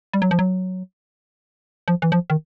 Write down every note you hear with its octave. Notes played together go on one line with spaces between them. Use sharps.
G3
F#3
F3
F#3
F3
E3
F3
D#3